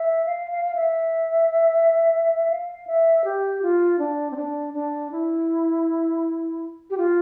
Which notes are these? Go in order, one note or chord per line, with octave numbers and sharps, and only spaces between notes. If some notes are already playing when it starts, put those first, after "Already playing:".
Already playing: E5
F5
F5
F5
E5
F5
E5
G4
F4
D4
C4
D4
D4
E4
G4
F4